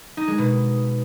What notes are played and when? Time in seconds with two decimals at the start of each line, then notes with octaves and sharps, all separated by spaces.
0.17 D#4
0.28 G#3
0.38 B2